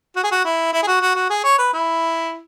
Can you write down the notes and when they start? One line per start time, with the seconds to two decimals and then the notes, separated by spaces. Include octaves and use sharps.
0.16 F#4
0.24 G#4
0.32 F#4
0.45 E4
0.73 E4
0.83 G#4
0.87 F#4
1.01 F#4
1.16 F#4
1.30 G#4
1.44 C#5
1.59 B4
1.73 E4